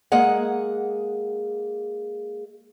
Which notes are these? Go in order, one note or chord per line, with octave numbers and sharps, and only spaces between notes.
G#3 A#3 G#4 F#5